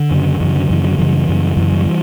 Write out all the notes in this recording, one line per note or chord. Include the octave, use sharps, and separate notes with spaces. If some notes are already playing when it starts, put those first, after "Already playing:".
Already playing: D3
F#2 C#3
F#2 C#3 E3
D3 F#3
F#2 C#3 E3
D3 F#3
F#2 C#3 E3 G3
F#2 C#3
F#2 C#3 E3
E3 G3
E3 G3